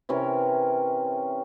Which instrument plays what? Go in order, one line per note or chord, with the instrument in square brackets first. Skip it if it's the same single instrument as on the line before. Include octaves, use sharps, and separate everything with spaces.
[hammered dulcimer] C3 E3 C#4 A#4